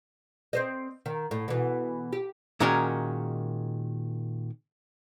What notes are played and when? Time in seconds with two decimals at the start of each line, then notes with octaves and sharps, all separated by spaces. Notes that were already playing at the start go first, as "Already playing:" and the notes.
0.53 C4 C5 D#5
1.06 D#3
1.31 A2
1.48 B2 E3
2.13 G4
2.60 A#2 D#3 G#3 C#4 F#4 A#4